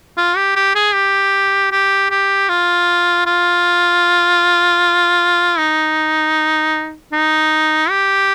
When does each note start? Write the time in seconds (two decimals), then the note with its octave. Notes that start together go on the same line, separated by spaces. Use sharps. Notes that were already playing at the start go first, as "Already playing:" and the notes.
0.17 F4
0.37 G4
0.56 G4
0.75 G#4
0.94 G4
1.72 G4
2.11 G4
2.49 F4
3.26 F4
5.58 D#4
7.13 D#4
7.90 G4